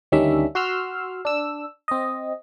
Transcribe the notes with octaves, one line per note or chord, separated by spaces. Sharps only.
D2 D#3 G3 C#4 D4 E5
F#4 C6 E6 F6
D4 E6
C4 D#5